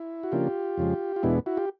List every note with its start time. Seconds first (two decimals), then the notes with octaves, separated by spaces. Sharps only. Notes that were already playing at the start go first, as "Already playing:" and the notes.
Already playing: E4
0.23 F#4
0.32 C#3 F3 A#3 D4 F4 G4
0.78 F2 C#3 F3 G#3
1.16 F4
1.23 E2 B2 G#3 B3 D4 E4
1.46 E4 F#4
1.57 F4 G4